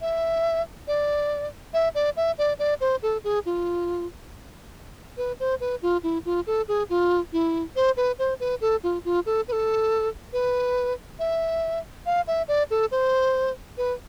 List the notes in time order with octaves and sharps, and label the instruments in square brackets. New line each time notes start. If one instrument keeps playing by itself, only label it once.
[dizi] E5
D5
E5
D5
E5
D5
D5
C5
A4
G#4
F4
B4
C5
B4
F4
E4
F4
A4
G#4
F4
E4
C5
B4
C5
B4
A4
F4
F4
A4
B4
A4
B4
E5
F5
E5
D5
A4
C5
B4